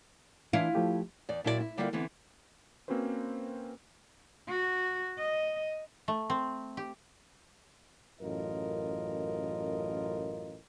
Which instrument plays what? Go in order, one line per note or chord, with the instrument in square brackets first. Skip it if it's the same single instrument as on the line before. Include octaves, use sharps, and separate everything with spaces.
[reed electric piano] E3 D4 [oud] E4 F4
[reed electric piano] F3 A3 G4
[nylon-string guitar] E2 D5
A#2 F#3 E4 F#4 G#4 D5
E4
D3 G3 A#3 E4 F4 D5
D3 E3 B3 C4
[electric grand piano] A#3 C4 C#4 F#4 B4 C5
[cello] F#4
D#5
[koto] A3
C4
G4
[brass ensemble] A1 F#2 F4 A#4 D#5